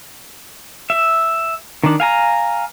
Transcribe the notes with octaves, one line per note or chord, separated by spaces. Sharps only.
E5
D#3 D4
F5 G#5 A#5